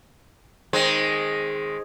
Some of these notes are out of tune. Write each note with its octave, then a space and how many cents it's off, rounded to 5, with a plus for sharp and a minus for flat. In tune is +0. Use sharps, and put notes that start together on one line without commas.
D#3 +0 G#3 +0 C4 +15